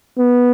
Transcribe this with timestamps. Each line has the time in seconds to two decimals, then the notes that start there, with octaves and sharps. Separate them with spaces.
0.18 B3